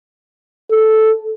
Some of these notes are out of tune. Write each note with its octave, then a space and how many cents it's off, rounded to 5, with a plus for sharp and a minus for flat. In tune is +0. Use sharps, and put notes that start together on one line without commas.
A4 -5